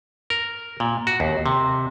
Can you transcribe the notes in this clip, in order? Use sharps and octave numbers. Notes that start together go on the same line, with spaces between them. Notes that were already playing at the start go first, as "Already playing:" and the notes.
A#4
A#2
F#4
D#2
C3